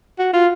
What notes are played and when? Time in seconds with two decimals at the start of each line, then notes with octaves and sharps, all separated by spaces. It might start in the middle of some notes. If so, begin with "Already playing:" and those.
0.19 F#4
0.33 F4